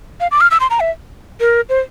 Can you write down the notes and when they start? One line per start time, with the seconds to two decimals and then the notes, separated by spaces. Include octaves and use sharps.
0.20 F5
0.31 D6
0.41 F6
0.51 E6
0.60 C6
0.70 A#5
0.80 E5
1.40 A#4
1.69 C5